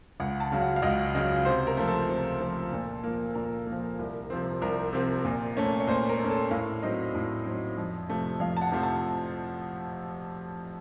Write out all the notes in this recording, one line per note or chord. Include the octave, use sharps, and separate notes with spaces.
C#2 F#5
A5
C#3 F#3
F#5
F5
C#2 D#5
C#3 F#3 D#5
C3 C5
A#4
F3 A3
A4
C3
F3 A3
A#2
F3 A#3
A#2 A#4
F3 A#3
C2
C3 F3 C4
C2 A#4
C3 F3 C4
A#2
A3 C#4
C#5
A#2 C5
A#4
A3 C#4
A4
A2 F5
F#3 C4 D#4 D#5
A2
F#3 C4 D#4
F2
C3 F3 A3
F2 F5
A5
F#5
C3 F3 A3
A5